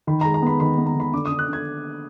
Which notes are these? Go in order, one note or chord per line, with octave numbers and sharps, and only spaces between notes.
D#3 B5
A#5
G#3
A#5
B3 B5
D#3 B5
B3
A#5
D#3 B5
D3 D6
D#6
D3
F#6
D3 G#6